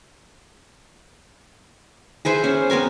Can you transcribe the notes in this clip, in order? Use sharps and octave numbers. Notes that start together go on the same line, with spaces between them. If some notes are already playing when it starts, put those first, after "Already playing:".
G#4 B4 C5 E5
C#4
B3 C4 A#4 G#5